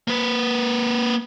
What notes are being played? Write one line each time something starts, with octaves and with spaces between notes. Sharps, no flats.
A#3 B4